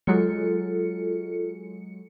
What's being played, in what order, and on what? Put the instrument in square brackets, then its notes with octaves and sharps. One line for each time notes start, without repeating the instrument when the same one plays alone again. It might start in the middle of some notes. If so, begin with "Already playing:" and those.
[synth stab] F#3 G#3 C#7 [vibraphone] F4 A4